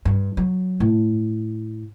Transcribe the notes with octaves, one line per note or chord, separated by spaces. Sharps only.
G2
F#3
A2